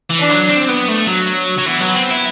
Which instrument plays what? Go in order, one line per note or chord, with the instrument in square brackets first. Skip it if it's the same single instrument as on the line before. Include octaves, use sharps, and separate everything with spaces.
[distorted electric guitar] E3
[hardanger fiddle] D4
[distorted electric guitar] F#3
C4
B3
A3
F#3
F#3
[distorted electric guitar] E3 [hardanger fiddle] B3
[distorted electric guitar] F#3
C4
E4